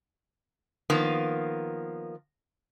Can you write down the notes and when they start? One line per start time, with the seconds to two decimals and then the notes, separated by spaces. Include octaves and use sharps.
0.90 D#3 F3 A#3 B3